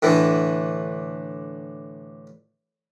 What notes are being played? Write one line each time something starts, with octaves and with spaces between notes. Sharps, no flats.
A2 D3 E3